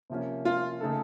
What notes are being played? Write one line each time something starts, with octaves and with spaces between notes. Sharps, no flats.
C3 F3 A#3 C#4
F4
C#3 A3 D#4 A4